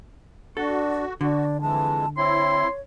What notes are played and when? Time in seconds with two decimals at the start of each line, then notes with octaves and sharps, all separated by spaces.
0.57 D4 F#4 A4
1.21 D3 D4 F#4
1.61 F2 E3 G#3 A5
2.17 C4 E4 C#5 C6